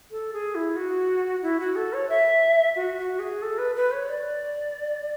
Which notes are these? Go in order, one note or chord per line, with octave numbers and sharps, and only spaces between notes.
A4
G#4
E4
F#4
E4
F#4
A4
C#5
E5
F#4
F#4
G#4
A4
B4
B4
C#5
D5